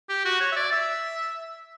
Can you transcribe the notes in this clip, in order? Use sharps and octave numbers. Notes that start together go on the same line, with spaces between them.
G4
F#4
C#5
E5
D5
E5